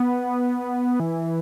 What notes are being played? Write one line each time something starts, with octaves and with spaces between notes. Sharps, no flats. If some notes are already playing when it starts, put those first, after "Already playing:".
Already playing: B3
E3